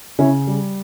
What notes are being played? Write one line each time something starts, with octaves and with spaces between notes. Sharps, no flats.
C#3 C#4 E4
G3